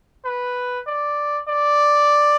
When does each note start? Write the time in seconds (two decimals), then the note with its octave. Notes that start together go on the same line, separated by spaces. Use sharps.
0.25 B4
0.87 D5
1.48 D5